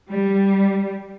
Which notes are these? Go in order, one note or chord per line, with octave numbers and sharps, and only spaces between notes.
G3